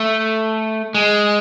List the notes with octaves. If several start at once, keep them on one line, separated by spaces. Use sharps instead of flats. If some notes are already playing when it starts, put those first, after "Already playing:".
Already playing: A3
G#3